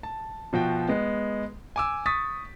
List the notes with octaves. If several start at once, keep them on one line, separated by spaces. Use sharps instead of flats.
A5
B2 F3 F#4 G5
G#3 B3
G#5 D6 E6
C#6 D#6 A6 B6